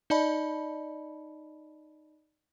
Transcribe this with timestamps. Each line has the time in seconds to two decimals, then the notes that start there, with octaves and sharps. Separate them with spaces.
0.10 D#4 D5 D#5 A5 B5